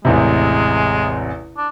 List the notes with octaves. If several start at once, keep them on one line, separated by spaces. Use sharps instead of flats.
A1 E2 C3 G#3
D4